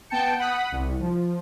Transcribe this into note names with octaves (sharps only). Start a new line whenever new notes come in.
B3 G5 A5 G6 C#7
F#5 B5 D#6
C2
F3